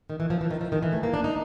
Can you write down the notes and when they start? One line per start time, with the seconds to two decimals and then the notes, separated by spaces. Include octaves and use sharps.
0.10 D#3
0.20 E3
0.30 F3
0.41 E3
0.51 D#3
0.61 F3
0.72 D#3
0.83 E3
0.92 A3
1.03 A#3
1.14 D4
1.24 D#4